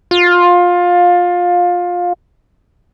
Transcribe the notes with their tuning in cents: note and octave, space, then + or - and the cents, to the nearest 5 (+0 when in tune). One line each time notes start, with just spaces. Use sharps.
F4 +20